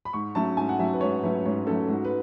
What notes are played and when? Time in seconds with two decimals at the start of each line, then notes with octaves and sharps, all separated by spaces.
0.05 B5
0.13 G#2 C#6
0.35 F#3 A3 C#4 A5
0.57 G#2 G#5
0.69 F#5
0.79 F#3 A3 C#4 E5
0.93 B4
1.01 G#2 C#5
1.23 F#3 A3 C#4 B4
1.46 G#2 C#5
1.67 F#3 A3 C#4 A4
1.88 G#2 F#4
2.05 B4